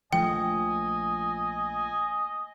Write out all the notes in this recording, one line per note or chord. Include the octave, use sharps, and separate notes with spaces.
A#1 F3 A3 D#5 G5 G#5